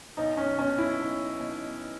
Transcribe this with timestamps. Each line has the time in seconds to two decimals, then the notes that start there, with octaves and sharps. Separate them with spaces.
0.17 B1 D#4
0.37 C#4
0.58 B2 C#4
0.78 E4
1.00 B1
1.40 B2